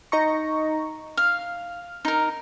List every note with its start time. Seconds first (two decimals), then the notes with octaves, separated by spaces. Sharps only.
0.12 D#4 A#5 C#6
1.17 F5 F6
2.05 D#4 A#4